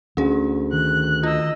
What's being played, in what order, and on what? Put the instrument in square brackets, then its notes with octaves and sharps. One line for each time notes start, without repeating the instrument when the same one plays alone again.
[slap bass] D2 [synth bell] C#4 G#4
[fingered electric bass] D#3 [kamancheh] F#6
[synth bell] F4 [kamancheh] D#5 E6